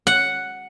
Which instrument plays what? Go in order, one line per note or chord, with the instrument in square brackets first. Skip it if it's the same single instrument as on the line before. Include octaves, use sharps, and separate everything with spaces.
[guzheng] F#5